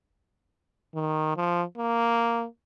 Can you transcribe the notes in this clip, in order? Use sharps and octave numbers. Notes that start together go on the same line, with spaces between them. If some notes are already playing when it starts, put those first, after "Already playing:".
D#3
F3
A#3